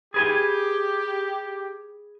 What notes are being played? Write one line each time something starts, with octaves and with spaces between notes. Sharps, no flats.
G4 G#4 B4 G#5